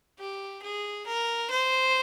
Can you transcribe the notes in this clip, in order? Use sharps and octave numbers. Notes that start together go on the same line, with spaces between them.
G4
G#4
A#4
C5